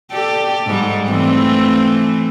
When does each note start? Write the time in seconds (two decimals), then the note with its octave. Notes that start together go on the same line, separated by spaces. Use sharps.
0.12 G4 A4 D5
0.66 G#2 G3
1.09 E3 A3 C4